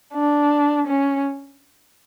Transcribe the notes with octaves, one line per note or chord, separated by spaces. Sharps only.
D4
C#4